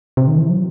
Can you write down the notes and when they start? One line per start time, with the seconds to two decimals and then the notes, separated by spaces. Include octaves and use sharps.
0.17 C3
0.28 D#3
0.38 E3
0.49 F#3